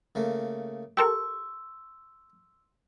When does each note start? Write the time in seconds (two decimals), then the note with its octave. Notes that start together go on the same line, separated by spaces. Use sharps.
0.15 C#3 A3 A#3
0.97 G4 A4 A#4 C6 C#6 E6